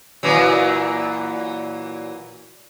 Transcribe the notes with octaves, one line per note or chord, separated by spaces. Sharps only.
A#2 E3 F#3